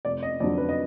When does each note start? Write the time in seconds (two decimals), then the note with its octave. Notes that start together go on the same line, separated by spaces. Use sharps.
0.05 F1 D5
0.23 D#5
0.40 F2 D3 F#3 D5
0.58 B4
0.69 D#5